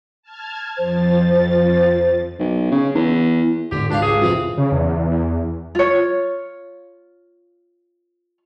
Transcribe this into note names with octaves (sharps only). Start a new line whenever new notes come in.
A5 F6 G#6
F2 F3 C5 A6
B1
C#3
E2
G#1 D3 G4
C#2 D4 G4 F5
G#4
F2 C3 E3 F3 C4
C#3
E2
F4 C#5